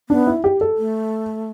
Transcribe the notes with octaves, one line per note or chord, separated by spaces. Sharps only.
B3 D4
E4
G4
A4
A3